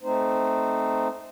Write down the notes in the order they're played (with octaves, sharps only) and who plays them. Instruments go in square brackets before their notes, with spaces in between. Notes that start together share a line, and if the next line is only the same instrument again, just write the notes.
[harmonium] A3 C4 D#4 C5